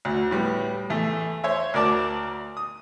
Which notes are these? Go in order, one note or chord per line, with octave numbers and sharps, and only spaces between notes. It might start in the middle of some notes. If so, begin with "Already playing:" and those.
D2
A2 G3 B3
E2 A3
C5 C#5 E5
D2 A#4 D5 A5 D6
D#6